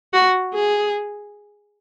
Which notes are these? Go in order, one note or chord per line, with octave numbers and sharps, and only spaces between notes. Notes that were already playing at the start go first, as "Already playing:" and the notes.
F#4
G#4